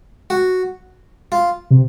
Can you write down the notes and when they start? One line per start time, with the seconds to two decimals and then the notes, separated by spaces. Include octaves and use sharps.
0.30 F#4
1.32 F4
1.70 C3